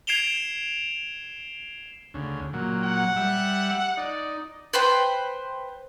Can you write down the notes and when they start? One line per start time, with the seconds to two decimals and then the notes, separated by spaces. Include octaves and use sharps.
0.07 G#6 C7 D7 E7 F7 G7
2.14 D2 C#3
2.53 A#2 F#3
2.83 F#5
3.16 G3 E5
3.97 D#4 D5
4.73 B4 C5 G5